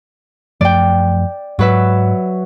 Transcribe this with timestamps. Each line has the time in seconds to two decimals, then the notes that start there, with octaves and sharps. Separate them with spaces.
0.61 F#2 F3 A3 D5 G5
1.59 G#2 F#3 B4 E5